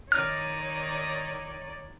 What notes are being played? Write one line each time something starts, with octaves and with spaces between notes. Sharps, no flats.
D#3 D#4 C#5 D5 F6